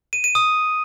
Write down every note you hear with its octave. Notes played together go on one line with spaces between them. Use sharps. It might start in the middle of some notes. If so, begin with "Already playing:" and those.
D#7
D#7
D#6